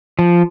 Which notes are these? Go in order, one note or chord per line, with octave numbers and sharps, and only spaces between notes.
F3